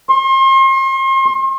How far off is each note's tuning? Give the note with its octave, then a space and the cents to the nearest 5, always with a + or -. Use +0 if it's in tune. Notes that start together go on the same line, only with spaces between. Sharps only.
C6 +40